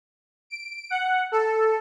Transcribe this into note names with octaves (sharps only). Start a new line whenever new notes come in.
D7
F#5
A4